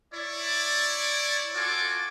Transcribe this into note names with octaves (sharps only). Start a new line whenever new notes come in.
E4 C#5 D5
F4 F#4 A4 G#5 D6